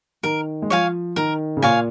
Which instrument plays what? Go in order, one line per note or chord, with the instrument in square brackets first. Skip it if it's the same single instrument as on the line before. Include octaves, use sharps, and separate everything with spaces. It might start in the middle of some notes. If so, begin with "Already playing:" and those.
[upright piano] D#3 [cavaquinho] A#4
[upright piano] G#3
[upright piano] F3 [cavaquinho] C#5 F5 G#5
[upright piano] D#3 [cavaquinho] A#4
[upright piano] C#3
[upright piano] A#2 [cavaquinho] C#5 F5 G#5